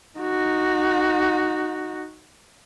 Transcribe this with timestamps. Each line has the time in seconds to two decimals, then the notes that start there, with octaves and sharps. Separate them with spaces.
0.19 D#4 F#4